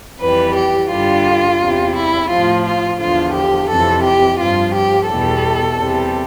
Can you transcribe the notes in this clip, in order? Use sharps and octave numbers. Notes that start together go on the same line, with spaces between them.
F2 E3 G3 B4
G4
G2 D3 G3 F4
E2 C3 G3
E4
A2 F3 F4
F4
E2 D3 F3 F4
G4
F2 C3 E3 A4
G4
G2 F3 F4
G4
E2 B2 G3 A4
E2 C3 G3